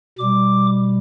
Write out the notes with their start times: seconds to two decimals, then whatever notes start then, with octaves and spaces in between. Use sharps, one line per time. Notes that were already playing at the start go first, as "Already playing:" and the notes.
0.18 B2 G3 D6